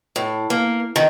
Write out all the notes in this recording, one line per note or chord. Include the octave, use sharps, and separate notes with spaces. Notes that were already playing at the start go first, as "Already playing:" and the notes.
A2
A#3
D#3